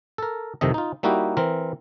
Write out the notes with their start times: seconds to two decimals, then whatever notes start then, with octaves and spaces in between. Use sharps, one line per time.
0.18 A4 A#4
0.61 C2 F2 C3 D#3 A4 D#5
0.74 D#4 F4
1.03 G3 A#3 D#4 E4 F#4 G4
1.37 E3 C4 A#4